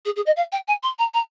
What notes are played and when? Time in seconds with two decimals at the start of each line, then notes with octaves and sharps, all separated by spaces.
0.05 G#4
0.16 G#4
0.26 D#5
0.36 F5
0.52 G5
0.68 G#5
0.83 C6
0.98 A#5
1.14 A#5